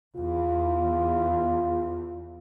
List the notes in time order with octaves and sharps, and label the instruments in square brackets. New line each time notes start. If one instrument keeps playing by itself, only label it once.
[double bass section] E2 [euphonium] F4